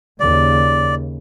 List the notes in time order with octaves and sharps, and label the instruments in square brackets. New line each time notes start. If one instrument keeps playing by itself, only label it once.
[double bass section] D#2 C#3 [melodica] D5